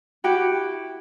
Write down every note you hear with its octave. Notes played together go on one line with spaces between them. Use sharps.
E4 F#4 G4